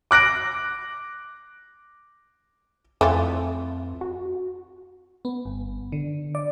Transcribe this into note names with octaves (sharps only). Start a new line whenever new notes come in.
D6 F#6 A#6 D7
F2 E3 A3 F4
F#4
B3
G1
D3
D5